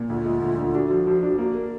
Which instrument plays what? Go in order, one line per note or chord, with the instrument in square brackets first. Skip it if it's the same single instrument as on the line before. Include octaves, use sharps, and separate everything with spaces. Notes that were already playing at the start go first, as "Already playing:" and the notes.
Already playing: [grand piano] A#2
[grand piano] D2 [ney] F4
[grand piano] G#3
D2
D3
[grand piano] D4 [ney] F#4
[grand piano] F3
F3
D4
[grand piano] A#3 [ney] F#4
[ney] A#4